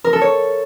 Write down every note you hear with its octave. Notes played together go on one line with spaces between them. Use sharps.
A#4
A4
C#5